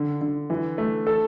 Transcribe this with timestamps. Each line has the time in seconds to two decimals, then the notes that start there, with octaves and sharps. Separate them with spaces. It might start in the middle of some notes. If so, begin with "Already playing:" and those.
Already playing: D3
0.21 D3
0.50 E3
0.78 A3
1.07 A4 A5